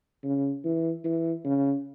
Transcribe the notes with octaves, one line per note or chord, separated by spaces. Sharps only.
C#3
E3
E3
C#3